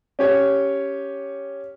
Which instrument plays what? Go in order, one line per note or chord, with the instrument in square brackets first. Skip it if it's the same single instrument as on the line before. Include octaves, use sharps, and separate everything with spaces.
[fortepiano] C#4 G4 C#5